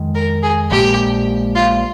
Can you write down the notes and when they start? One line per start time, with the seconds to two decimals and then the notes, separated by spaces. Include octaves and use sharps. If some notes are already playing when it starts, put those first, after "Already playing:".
Already playing: F2 D#3 G#3
0.15 A#4
0.42 G#4
0.71 A#1 A#2 G#3 G4
1.55 F4